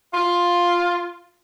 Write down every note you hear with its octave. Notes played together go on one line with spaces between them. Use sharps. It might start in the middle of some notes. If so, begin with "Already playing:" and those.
F4